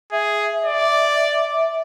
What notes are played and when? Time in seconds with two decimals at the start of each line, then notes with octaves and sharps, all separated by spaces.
0.12 G#4 E5
0.65 D5